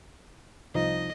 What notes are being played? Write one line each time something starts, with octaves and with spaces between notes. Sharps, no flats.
C2 F3 D#4 D#5